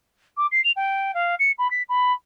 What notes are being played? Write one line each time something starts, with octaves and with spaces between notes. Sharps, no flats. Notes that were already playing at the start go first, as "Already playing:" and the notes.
D6
C7
F7
G5
F5
C#7
B5
B6
B5